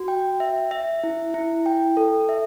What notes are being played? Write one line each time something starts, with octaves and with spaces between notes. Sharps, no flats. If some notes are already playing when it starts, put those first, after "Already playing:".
Already playing: F#4
G5
E5
E5
E4
E4
G5
A4
E5